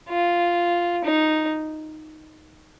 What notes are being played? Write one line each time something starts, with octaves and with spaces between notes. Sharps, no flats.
F4
D#4